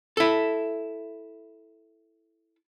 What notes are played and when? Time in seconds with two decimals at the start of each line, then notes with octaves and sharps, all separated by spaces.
0.17 E4 A4